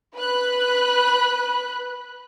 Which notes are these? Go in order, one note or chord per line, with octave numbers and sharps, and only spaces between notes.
B4 B5 F#6